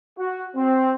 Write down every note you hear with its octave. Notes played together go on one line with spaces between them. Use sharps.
F#4
C4